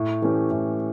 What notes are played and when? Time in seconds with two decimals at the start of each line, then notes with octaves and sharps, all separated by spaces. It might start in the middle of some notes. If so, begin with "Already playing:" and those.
Already playing: A2
0.22 E3 A3 C#4 G4
0.51 A2